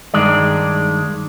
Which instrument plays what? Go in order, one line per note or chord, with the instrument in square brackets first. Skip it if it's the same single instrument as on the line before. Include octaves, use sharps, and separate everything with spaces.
[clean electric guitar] G2 D#3 G#3 D5